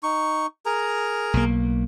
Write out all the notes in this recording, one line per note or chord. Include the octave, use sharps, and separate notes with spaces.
D#4 C#6
G#4 A#4 A#5
B1 A#3